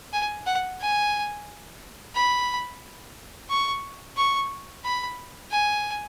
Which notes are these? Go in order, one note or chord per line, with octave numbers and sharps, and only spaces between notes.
G#5
F#5
G#5
B5
C#6
C#6
B5
G#5